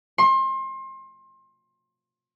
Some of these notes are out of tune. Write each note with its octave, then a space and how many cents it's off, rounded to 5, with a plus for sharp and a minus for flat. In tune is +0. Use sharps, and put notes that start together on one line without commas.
C6 +30